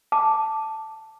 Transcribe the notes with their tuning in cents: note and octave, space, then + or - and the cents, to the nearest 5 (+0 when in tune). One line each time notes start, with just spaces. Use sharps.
A5 +0 D6 +0